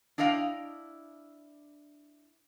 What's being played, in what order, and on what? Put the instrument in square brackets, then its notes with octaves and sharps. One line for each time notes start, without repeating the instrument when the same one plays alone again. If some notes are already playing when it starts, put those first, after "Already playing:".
[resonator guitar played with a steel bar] D4 E4 D#5 F5 G5